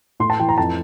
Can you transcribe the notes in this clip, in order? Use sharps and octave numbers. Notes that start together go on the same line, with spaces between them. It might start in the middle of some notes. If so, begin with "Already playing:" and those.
A2 C6
A5
E3 G5
A#5
F2 A5